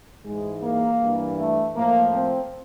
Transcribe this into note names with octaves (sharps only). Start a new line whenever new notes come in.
G#2 E3 G#3
A#3
G2 E3
A3
A2 F3 A#3
C4